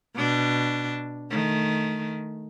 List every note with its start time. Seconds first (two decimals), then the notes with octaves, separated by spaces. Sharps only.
0.15 B2 D4
1.30 D#3 A3